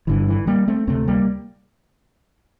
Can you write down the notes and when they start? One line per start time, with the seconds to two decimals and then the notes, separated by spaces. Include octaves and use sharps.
0.07 G1 G2 D3 E3
0.28 E3
0.47 G3 A#3
0.68 A3 C4
0.87 D2 C3 A3 C4
1.08 G3 A#3